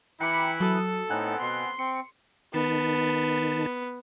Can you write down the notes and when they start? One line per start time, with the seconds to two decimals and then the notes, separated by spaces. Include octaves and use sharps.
0.21 E3 E4 G5 A#5 B5 D6 F#6 C#7
0.60 F#3 F#4 A4 D#6
1.10 A2 B3 C4 D#4 F#5 G#5 F#6
1.41 B2 C6
1.79 C4 C#7
2.54 D#3 B3 A5